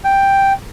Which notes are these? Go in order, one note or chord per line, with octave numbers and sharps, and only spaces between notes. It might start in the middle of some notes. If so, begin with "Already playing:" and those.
G5